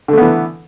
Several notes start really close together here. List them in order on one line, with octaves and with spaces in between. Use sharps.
D3 A3 B3 E3